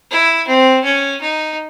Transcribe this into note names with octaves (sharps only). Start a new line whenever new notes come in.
E4
C4
C#4
D#4